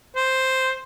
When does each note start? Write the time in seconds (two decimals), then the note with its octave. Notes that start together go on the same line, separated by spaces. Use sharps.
0.16 C5